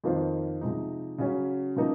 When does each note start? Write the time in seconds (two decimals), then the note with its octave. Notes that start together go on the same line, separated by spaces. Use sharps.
0.04 F2 D#3 A#3 F4 C5
0.61 C3 F3 G#3 D#4
1.18 C#3 F#3 C#4
1.76 C#3 F3 A#3 D#4